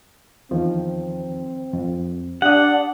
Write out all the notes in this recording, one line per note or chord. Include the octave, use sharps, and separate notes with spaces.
E2 D#3 F3 C4
F2
D4 G4 F#5 D#6